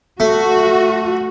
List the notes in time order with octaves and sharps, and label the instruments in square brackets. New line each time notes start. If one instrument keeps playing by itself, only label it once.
[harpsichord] A3 [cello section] F#4